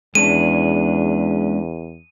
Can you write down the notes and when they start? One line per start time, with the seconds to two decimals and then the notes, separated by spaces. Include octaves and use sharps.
0.15 E2 G#3 C#4 D4 D#7